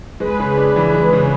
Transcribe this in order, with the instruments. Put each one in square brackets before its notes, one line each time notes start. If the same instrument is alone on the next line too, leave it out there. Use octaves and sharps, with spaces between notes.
[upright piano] G#3 [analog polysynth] G#4 B4
[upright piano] C#3
D4
E3
G#3
C#3